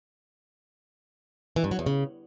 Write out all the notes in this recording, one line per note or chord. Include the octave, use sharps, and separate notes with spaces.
E3
G2
F#3
E2
C#3